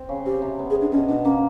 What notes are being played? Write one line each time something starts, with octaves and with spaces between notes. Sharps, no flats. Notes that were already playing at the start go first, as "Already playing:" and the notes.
Already playing: C4
C#3
C4 G4
C3
B3
G#4
C3
D4
B2 C#4
B2 D4
A#3 C#4